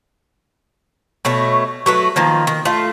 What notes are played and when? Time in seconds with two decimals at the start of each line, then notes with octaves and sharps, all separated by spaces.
1.25 B2 A3 C#5
1.86 F#3 A3 B4
2.16 D#3 F3 A#3
2.47 D#3
2.65 A3 F4